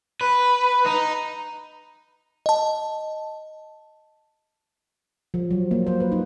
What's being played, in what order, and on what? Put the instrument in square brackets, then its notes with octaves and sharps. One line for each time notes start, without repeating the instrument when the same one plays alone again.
[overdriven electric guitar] B4
D#4
[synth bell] D#5 A5
[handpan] F3
F#3
A#3
C5
B4
D#4